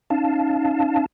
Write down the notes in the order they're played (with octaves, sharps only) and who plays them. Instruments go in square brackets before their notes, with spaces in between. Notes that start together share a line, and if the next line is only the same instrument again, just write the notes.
[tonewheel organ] C#4 D#4 F5 A5